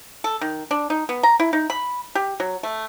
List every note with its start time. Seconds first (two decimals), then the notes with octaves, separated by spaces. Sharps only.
0.24 A4
0.41 D#3
0.71 D4
0.90 D#4
1.09 B3
1.23 A#5
1.40 E4
1.53 D#4
1.70 B5
2.15 G4
2.40 F#3
2.63 A3